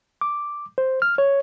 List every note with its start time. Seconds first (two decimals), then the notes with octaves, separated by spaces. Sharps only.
0.21 D6
0.78 C5
1.02 F6
1.18 C#5